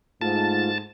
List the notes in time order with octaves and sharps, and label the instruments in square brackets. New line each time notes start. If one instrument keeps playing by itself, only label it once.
[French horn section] G#2 [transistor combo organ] A3 F4 [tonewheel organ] A5